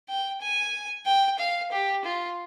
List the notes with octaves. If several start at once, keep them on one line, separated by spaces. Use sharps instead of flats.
G5
G#5
G5
F5
G4
F4